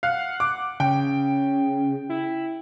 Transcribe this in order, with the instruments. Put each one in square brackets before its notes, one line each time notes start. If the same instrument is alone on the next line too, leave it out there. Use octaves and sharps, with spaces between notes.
[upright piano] F5 [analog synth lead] F#5
[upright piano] D6
[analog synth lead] C#3 [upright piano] G5
[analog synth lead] E4